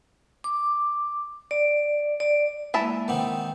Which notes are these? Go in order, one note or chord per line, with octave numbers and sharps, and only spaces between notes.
D6
D5
D5
E3 G#3 A#3 E5 A5
D#3 B3 C4 D6